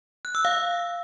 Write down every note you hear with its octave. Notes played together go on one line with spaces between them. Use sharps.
F#6
E6
F5